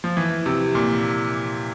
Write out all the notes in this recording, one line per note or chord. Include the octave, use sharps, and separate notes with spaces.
F3
E3
C3
A#2